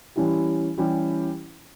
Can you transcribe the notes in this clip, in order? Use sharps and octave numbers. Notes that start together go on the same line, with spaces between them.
E3 G3 C#4 E4 G4
E3 G3 C#4 E4 G4